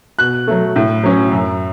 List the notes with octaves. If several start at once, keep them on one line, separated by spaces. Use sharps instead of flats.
B2 F#6
F#3 A3
A2
F#3 C#4
F#2